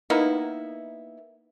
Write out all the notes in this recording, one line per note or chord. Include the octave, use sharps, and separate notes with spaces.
A#3 B3 D#4 E4